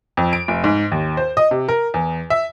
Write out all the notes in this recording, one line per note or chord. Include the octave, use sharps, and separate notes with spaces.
F2
D7
F1
G#2
D#2
C5
D#5
C3
A#4
E2
E5